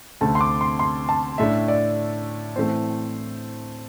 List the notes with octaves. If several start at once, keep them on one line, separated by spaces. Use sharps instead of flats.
D2 C3 A3 C4 A5
C6
D6
C6
C6
A5
A2 A3 D4 E5
D5
A2 E3 A3 C4 C5